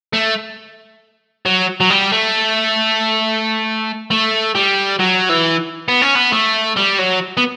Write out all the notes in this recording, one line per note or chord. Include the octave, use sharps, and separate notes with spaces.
A3
F#3
F#3
G3
A3
A3
G3
F#3
E3
B3
C#4
B3
A3
G3
F#3
B3